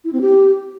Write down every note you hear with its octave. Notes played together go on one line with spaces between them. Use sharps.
E4
C4
G4